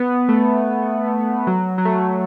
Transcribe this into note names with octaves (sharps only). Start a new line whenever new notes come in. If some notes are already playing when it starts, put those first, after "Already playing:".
Already playing: B3
A3
F#3
F#3
A3